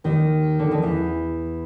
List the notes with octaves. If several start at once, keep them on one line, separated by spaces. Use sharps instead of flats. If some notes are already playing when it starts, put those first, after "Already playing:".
D#2 D#3
D3
D#3
E2 E3